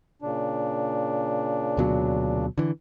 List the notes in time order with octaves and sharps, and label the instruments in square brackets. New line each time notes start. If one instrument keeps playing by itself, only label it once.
[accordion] A#2 C#3 D4
[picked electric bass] D2 B2 F#3
D3 E3